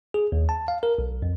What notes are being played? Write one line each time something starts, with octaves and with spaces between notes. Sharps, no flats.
G#4
D#2
A5
F5
A#4
B1
F2